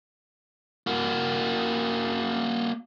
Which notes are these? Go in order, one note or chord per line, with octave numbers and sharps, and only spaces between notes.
A#3 F#4